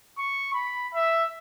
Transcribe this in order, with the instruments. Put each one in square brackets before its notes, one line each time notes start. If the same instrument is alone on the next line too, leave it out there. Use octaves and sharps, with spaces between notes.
[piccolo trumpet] C#6
B5
E5